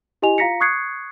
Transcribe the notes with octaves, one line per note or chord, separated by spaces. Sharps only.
E4 G4 D#5 G#5 F7
F4 F5 A#5 A#6 B6 C#7
C#6 D#6 F#6 G#6 C7 C#7